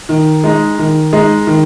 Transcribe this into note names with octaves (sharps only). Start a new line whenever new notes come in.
D#3
G#3 D#4
D#3
G#3 D#4
D#3